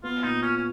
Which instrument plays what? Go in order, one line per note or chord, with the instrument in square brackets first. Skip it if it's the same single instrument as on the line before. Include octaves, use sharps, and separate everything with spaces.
[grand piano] B3 [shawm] F4
[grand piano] A#2 [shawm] D#4
[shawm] C#4 [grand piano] F4
[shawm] C#4